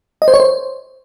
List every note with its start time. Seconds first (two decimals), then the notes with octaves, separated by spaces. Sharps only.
0.22 D#5
0.28 C5
0.34 C#5
0.40 C5